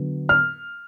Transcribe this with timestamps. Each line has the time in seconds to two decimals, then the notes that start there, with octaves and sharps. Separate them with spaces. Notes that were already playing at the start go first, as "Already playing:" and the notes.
Already playing: D3 F#3 B3
0.29 F6